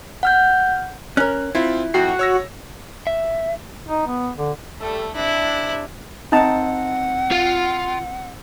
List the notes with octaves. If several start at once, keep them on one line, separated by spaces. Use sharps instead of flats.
F#5 F6 G6
C#4 A#4 F#6
C4 E4 F4
F2 F#4 G5 C7
C#5 E6 A#6
E5
D#4
B3
D3
G3 A3 A4
C3 D4 E4
C4 D#4 F#5 A5
F4 F5